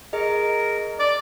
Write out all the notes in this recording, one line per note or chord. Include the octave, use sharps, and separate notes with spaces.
G#4 A#4 D#5
D5